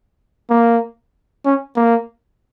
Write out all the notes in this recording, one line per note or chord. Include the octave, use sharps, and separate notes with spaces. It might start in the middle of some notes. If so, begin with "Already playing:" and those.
A#3
C#4
A#3